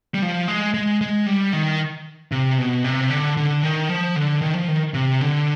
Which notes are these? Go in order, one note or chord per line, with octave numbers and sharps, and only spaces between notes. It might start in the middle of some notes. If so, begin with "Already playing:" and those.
G3
F3
G#3
G#3
G#3
G3
D#3
C3
B2
C3
D3
D3
D#3
F3
D3
D#3
F3
D#3
C3
D3